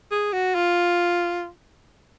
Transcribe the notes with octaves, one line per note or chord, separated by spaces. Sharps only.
G#4
F#4
F4